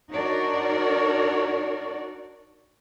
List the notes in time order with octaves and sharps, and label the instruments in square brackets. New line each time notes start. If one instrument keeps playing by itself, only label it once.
[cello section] D4 D#4 F#4 A#4 C#5 D5